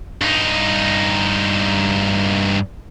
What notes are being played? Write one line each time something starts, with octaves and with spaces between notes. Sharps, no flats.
G2 D#4